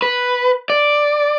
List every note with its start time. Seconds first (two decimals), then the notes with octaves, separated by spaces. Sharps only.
0.02 B4
0.70 D5